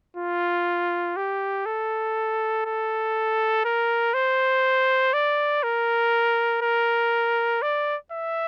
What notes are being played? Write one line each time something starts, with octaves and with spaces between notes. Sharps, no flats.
F4
G4
A4
A4
A#4
C5
D5
A#4
A#4
D5
E5